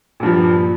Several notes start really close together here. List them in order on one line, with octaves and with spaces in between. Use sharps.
A#2 G2 F3